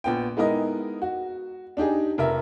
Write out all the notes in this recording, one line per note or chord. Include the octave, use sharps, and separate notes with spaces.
A#1 B3 G5
G#3 B3 D#4 E4 A#4 D#5
F#4
D4 D#4 G4 G#4
F1 A#4 E5